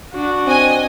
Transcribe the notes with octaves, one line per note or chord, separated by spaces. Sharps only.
D4 F#4
C4 D#5 G#5